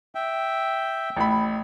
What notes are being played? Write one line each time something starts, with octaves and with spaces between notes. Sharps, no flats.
E5 G5
A1 B5